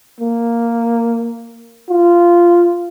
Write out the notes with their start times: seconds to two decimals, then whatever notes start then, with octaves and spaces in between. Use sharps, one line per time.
0.20 A#3
1.90 F4